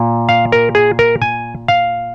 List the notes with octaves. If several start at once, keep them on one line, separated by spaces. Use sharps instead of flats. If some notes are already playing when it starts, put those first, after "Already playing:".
Already playing: A#2
F5
A#4
G#4
A#4
G#5
F5